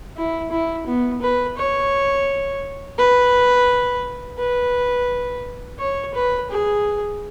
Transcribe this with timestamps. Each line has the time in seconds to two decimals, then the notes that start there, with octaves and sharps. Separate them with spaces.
0.17 E4
0.51 E4
0.87 B3
1.22 B4
1.57 C#5
2.98 B4
4.39 B4
5.79 C#5
6.14 B4
6.51 G#4